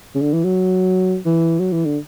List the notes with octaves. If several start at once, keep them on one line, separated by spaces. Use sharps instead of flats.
C#3
D3
E3
F#3
E3
F#3
E3
D3